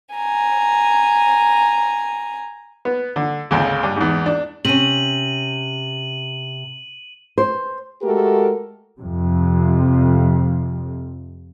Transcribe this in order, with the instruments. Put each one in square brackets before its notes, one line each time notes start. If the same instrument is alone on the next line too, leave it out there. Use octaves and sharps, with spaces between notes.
[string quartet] G#5 A#5
[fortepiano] B3
D3
G#1 D2 C#3
G2
E2 G#2
D4
[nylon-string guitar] C3 C#4 [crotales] D#7 F#7
[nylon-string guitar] C5
[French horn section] G#3 A3 F#4 G4 A4 A#4
[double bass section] F2 C3